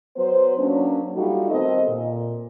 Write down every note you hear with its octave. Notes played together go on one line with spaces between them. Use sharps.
F#3 B3 B4 C5
F#3 A#3 C#4 D4
G3 A3 D#4 F4 F#4
D#3 B3 C4 A4 D#5
A#2